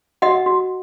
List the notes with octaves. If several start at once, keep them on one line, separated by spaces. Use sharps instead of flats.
F#4 D#5 F#5
F#4